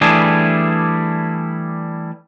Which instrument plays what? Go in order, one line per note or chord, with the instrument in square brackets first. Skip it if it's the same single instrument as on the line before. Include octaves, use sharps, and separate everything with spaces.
[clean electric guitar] E3 G3 A3 D4 E4 G#4